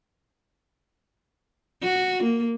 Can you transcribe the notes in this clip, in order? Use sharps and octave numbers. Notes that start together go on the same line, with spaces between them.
F#4
A#3